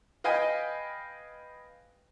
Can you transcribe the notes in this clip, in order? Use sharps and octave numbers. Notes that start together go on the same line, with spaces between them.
B4 D#5 F5 G5 G#5